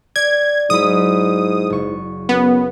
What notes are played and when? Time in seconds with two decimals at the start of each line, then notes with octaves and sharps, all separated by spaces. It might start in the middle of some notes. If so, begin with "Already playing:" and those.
0.16 D5 G#6
0.70 G#2 F#3 E4 B5 D#6
1.70 F#1 C#6
2.29 F#2 B3